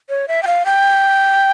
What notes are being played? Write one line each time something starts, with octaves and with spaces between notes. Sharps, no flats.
C#5
E5
G5
F5
G5